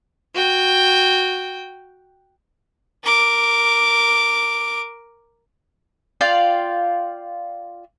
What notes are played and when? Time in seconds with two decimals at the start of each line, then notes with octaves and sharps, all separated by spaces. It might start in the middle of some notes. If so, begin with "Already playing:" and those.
0.35 F#4 G5
3.04 A#4 D6
6.21 F4 D5 F5 G5